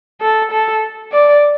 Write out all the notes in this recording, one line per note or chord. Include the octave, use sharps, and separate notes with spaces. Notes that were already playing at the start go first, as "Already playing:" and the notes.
A4
A4
D5